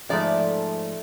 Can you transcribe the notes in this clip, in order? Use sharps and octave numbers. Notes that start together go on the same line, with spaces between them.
G#2 F3 A3 D5